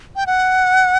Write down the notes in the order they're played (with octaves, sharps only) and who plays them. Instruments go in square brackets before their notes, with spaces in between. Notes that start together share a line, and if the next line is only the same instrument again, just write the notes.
[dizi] G5
F#5